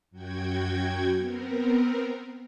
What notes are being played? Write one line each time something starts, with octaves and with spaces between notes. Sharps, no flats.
F#2 F#4 G5 G#6
B3 C4 A#4